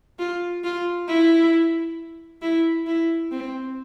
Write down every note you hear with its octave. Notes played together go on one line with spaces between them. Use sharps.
F4
F4
E4
E4
E4
C4